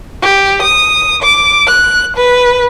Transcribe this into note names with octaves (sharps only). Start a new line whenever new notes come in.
G4
D#6
D6
F#6
B4